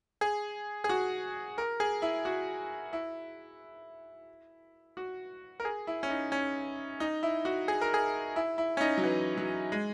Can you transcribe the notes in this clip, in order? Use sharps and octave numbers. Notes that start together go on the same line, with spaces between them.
G#4
G#4
F#4
A#4
G#4
E4
F#4
E4
F#4
A#4
G#4
E4
C#4
D#4
C#4
D#4
E4
F#4
G#4
A#4
G#4
E4
E4
C#4
D#4
F#3
E3
F#3
G#3